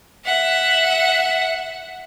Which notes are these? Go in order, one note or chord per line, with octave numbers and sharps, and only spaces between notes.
E5 F#5